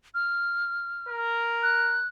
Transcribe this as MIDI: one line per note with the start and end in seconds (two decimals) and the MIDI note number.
0.15 1.19 89
1.09 2.01 70
1.63 2.07 90